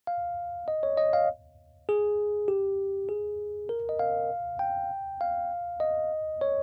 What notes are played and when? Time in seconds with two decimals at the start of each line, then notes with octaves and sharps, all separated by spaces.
0.07 F5
0.68 D#5
0.83 C#5
0.97 D#5
1.13 F5
1.89 G#4
2.48 G4
3.09 G#4
3.69 A#4
3.89 D#5
3.99 F5
4.59 G5
5.21 F5
5.80 D#5
6.41 C#5